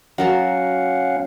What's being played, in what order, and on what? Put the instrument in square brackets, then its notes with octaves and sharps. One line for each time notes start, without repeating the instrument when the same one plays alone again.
[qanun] F#3 A#4 A5 [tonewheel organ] C#4 F5 F#5